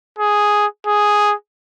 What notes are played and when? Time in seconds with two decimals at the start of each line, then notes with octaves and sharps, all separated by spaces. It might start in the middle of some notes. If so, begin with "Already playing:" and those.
0.19 G#4
0.87 G#4